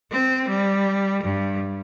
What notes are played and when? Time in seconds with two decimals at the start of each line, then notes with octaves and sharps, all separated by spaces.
0.11 C4
0.49 G3
1.23 G2